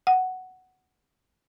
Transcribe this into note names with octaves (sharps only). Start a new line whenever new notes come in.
F#5